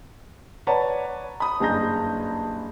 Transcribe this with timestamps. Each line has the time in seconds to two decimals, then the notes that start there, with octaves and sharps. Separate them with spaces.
0.67 B4 C#5 D5 F#5 A5 A#5
1.40 B5 D#6
1.60 F#1 G2 G#4 A#5 G6 A#6